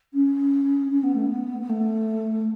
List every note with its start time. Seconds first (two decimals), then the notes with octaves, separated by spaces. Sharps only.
0.14 C#4
0.91 C#4
1.03 B3
1.15 A3
1.26 B3
1.61 B3
1.69 A3